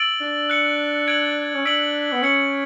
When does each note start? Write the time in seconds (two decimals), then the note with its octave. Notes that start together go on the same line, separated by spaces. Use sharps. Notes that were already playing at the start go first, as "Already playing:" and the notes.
Already playing: E6 A6 D7 F#7
0.21 D4
0.50 F#6 C#7 F#7
1.08 G#6 D7 F#7
1.55 C#4
1.65 D4 E6 B6 D7 F#7
2.12 B3
2.22 C#4 G#6 C#7 F#7